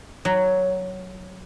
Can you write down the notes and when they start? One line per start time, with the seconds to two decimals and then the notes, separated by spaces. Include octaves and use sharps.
0.25 F#3